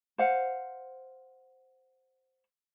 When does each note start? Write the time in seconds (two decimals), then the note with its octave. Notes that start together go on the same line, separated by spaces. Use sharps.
0.18 C5 F5 F#5